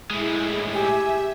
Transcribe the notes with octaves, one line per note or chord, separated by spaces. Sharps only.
A2 G#3 E4 G#4
G4 E5 G#5